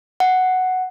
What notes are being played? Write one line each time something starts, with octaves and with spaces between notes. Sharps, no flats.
F#5